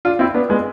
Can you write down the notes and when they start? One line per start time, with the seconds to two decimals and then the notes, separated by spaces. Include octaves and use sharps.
0.05 D4 F4
0.19 C4 E4
0.34 B3 D4
0.50 G#3 B3